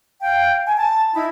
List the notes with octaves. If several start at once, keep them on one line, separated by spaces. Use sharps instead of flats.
F5 G5
G#5
A5
D#4 E4 B5